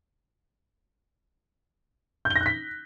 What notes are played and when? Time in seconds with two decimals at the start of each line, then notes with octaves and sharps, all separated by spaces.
2.25 G6
2.30 G7
2.36 A#6
2.41 F#6
2.46 B6